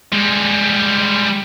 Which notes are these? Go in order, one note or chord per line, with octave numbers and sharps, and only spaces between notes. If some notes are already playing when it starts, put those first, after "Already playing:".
G3 G#3